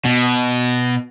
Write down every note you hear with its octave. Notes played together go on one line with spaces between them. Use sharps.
B2